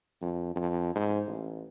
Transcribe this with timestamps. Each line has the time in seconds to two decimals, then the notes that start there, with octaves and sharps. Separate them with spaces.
0.22 F2
0.56 F2
0.95 G#2
1.28 A1